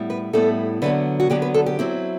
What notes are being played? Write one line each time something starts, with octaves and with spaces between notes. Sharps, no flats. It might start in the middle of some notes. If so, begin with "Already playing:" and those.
Already playing: A2 G3 B3 E4
B4
A2 G3 B3 E4 A4
D3 F#3 B3 B4
F#4
D3 F#3 B3 G4
B4
A4
G4
F#3 C4 E4